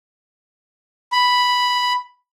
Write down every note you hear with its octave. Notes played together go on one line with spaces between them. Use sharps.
B5